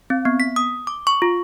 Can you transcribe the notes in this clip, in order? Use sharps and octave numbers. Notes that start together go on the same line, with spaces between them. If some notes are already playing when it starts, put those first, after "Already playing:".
C4
B3
B6
D#6
D6
C#6
F4